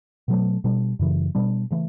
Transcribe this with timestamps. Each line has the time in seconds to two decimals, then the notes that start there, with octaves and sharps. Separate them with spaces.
0.28 B2 F#3 A3
0.64 B2 G3 D4
0.99 F#2 C#3 E3
1.35 B2 G3 D4
1.71 C#3 E3 A3